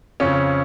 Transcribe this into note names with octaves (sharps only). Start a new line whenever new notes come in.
F2 C#3 C#4